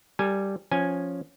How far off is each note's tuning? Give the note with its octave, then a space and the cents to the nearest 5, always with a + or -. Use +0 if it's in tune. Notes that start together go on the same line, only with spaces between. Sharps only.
G3 +0 A4 +45 G#5 +0
F3 +10 C#4 +0 G#5 +0